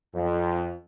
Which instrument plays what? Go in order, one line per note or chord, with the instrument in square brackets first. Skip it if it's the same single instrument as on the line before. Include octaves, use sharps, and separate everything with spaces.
[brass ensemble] F2